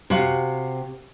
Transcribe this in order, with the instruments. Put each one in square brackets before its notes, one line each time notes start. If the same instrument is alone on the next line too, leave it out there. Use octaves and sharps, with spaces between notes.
[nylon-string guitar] C3 F#4 F5